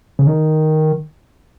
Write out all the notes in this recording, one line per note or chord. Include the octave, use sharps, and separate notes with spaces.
C#3
D#3